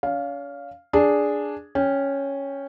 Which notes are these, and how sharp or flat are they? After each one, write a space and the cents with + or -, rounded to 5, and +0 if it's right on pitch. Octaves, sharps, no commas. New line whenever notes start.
C#4 +40 F5 +0
D4 -5 G#4 +0
C#4 +0 G5 +20